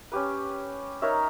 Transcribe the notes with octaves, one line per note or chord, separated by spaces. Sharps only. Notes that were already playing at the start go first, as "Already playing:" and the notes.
C#4 G4 B4
D#4 A#4 C#5 E5